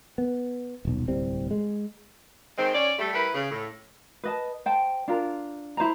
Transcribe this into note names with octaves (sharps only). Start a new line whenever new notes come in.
B3
D#1 B1
D1 C2 G3 C4
G#3
D#3 G#3 C4
C#4 C#5 D5
G3 A3
G3 E4 A#4 B4
C#3
A2
B4 D#5 A5
C5 G5 A5
D4 F4 A#4
E4 C5 G#5 A#5